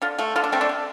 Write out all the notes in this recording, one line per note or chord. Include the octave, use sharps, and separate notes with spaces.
D3 F4
A3 F4
D3 F4
D4
A3 C4
D4
D3